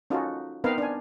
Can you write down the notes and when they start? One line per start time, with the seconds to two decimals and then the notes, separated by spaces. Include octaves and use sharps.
0.10 C#4 D#4 F4 F#4 A4
0.64 B3 C4 D#4 A#4 B4 F5
0.78 D4 G#5